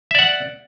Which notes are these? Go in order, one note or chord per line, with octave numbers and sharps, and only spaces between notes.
D5 E5 F#5